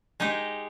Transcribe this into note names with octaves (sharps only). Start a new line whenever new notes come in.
G#3 D#4 G4